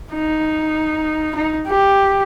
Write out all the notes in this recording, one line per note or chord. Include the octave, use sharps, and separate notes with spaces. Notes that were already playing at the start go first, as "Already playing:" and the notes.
D#4
D#4
G4